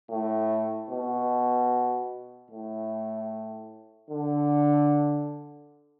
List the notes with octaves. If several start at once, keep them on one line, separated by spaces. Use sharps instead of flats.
A2
B2
A2
D3